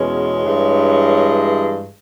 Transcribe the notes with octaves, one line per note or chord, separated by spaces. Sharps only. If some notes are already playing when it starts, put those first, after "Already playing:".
Already playing: E2 B2 G#3 C#4 C#5
G2 E3 G#3
C#5